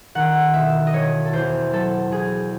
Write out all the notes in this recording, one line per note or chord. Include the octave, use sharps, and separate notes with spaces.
D#3 F#5
E1 E5
D#5
E1 C#5
A4
E2 C5
F#3 A4
E2 G#4